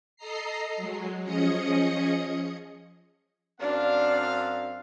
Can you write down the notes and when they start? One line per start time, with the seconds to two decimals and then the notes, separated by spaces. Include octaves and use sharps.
0.16 A4 D#5 A#5 C7
0.77 F#3 G#3
1.24 F3 C#4 G#4 D#5 D#6 C#7
3.61 F#2 C4 D4 F5